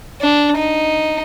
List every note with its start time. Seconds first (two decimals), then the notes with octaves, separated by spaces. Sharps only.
0.21 D4
0.57 D#4